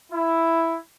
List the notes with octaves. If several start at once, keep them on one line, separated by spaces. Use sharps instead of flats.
E4